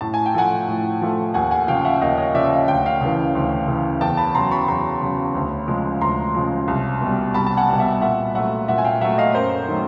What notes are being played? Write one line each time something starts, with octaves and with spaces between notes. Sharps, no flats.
A2 A5
G#5
G5
F3 A3 F#5 G#5
A2
F3 A3
D#2 F#5 G#5
F#5 G#5
C#3 F3 F5 G5
E5 F#5
D#2 D#5 F5
C#5 D#5
C#3 F3 D5 E5
D#5 F5
D2 G5
F#5
F5 G5
C#3 E3
D2
C#3 E3
E2 G5 A5
A5 B5
C#3 F#3 A#5 C6
B5 C#6
E2 A#5 C6
C#3 F#3
D2
C#3 F3 G#3
D2 A#5 C6
C#3 F3 G#3
C2
B2 G3
C2 A5 B5
A5
F#5 G#5
B2 G3
E5 F#5
A#2 E5 F#5
F#3 A3 E5 F#5
A#2 E5 F#5
G#5
F5 G5
F#3 A3 E5 F#5
D#5 F5
F#2 A#4 C5
D#3 F#3 A3